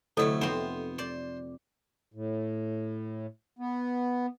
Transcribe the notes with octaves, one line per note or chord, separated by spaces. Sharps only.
D2 C3 F#3 A3 E4 A4 C#5 D#5
F2 B3 C4 D#4 C5 E5
C5 D5
A2
B3